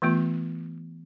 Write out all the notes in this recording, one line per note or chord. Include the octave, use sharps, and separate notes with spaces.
E3 A3 B3 F4